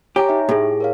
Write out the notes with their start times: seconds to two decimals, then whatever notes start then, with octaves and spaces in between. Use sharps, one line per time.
0.16 G4 C#5 G#5 A#5
0.29 D#4 E5
0.49 A2 G4 G#4
0.80 A#4 C#5 F5